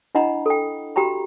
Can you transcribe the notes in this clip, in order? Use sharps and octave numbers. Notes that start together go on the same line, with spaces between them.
D4 E4 D#5 F#5 A#5 B5
A4 G5
F#4 G4 G5 A#5 B5